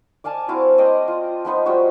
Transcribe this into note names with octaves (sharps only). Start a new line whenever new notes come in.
D5 F5 G#5 A5
C4 E4 F#4 F5
D5 D#5 G5 C6
F4
F3 B3 D#4 C5
G3 F4 F#4 C#5